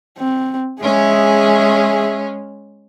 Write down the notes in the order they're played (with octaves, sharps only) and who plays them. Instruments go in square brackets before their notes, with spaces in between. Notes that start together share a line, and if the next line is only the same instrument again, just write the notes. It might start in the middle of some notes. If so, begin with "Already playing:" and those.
[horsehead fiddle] C4
[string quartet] G#3 C#4 [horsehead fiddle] G#4 E5